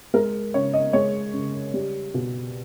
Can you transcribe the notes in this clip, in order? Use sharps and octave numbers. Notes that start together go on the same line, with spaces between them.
G#3 A#4
C#3 C#5
D#5
G#3 C#5
C#3
G3
B2